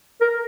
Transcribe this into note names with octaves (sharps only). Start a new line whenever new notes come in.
A#4